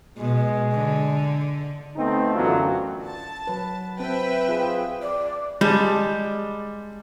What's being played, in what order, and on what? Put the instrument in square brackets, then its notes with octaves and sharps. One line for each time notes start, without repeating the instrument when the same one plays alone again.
[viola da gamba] B2 [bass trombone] G#3
[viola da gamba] D3
[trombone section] A3 B3 C4 D#4
F#2 D3 E3 F#3 F4
[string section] A5
[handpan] F#3 B4
[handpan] C4 [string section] B4 E5 G5
[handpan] F4 G#4
[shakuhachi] D5
[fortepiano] G3 A5 [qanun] G#3